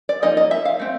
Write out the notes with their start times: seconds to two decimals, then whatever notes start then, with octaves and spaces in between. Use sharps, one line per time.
0.09 D5
0.22 F3 A#3 D#4 D#5
0.37 D#5
0.51 E5
0.65 F5
0.80 A3 C4